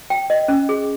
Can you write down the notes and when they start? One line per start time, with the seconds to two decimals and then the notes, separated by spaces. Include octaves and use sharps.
0.10 G5
0.30 D#5
0.48 C#4
0.69 G#4